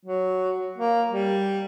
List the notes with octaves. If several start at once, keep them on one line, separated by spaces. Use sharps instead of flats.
F#3
A#3
G3